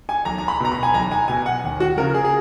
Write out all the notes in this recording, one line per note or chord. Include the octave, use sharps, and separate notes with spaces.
G#5
B1 A#5
A#5
B5
B2 A#5
B5
G#5
B1 A#5
G#5
B2 G#5
F#5
D#2
F#4
C#3 F3 A#4
G#4
G#4